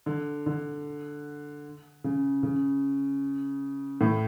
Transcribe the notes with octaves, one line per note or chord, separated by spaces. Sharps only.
D3
D3
C#3
C#3
A2